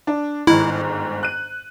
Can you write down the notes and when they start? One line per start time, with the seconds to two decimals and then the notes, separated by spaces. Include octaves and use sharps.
0.07 D4
0.47 G1 G#2 D#3 E4
1.23 F#6 D#7